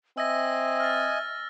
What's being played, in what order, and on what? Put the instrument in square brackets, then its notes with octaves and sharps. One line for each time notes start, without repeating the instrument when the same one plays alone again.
[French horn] C4 [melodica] D#5 G#5 [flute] E5 [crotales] E6 A#6
[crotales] F6 A6